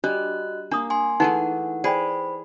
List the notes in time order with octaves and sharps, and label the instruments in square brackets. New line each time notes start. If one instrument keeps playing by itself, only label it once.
[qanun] G3 [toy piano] D4 [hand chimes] F#4 D#5 F#6
[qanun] A#3 [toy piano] D4 D#6
[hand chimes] G#5 C6
[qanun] E3 A3 G#4 [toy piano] D#4 G#5 [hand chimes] F#5
[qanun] G#4 [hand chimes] C5 B5 [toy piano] D5 G5